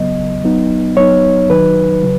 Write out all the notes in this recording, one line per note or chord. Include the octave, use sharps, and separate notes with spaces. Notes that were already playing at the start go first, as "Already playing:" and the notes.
Already playing: C#3 F#3 B3 D#5
F#3 B3 D#4
F#3 B3 D#4 C#5
D#3 F#3 D#4 B4
C#3 F#3